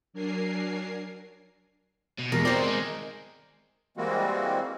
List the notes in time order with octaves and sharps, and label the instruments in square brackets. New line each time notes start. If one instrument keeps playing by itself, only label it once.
[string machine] F#3 D4 A#4 G#5 C7
[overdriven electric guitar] B2
[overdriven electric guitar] E2 [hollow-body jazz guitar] B2 G#3 [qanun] A#4
[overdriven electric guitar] C4 D#4 [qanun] C5 D#5 [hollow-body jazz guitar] D5
[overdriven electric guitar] D#3 G#3
[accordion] E3 G3 G#3 A#3 C4 F#4